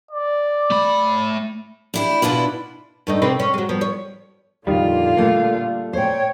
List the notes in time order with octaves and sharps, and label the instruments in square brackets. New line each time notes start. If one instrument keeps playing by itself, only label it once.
[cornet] D5
[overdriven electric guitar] A3 B5
[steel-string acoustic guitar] D4 E4 G4
B2 D4 E4 F4 B4
[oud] G2 A3 D#4
C3 C4 B4
C#4
F#3 G#3
F3 B3
C#5
[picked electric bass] F2 D#3 G3 [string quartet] A#2 D3 F4
[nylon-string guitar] G3 A3 [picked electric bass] A#3
[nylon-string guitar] A#2 C5 [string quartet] C#5 G5